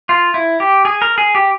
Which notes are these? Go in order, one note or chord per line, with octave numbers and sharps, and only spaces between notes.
F4
E4
G4
G#4
A#4
G#4
G4